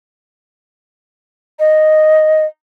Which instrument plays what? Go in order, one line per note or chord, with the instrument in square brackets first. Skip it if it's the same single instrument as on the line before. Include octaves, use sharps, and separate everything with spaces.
[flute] D#5